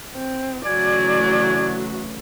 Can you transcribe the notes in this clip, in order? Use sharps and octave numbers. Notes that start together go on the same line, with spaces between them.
C4
C#3 E3 F#3 A3 F#4 D5 G#5